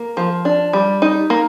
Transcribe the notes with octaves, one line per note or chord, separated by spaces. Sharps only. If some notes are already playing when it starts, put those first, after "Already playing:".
Already playing: A#3
F3
D4
G3
D#4
A#3